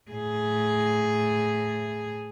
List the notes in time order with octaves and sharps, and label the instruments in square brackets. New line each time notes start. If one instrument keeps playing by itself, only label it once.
[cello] A2 G#4